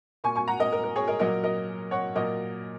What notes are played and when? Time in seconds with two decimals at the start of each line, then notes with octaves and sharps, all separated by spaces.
0.24 A#2 A#3 G#5 C#6
0.35 G#5 C#6
0.48 F#5 A#5
0.60 A#4 D#5
0.73 A#4
0.84 A#4
0.96 G#4 C#5
1.08 A#4 D#5
1.19 A#2 F#3 A#3 A#4 D#5
1.44 A#4 D#5
1.91 C#5 F#5
2.15 A#2 F#3 A#3 A#4 D#5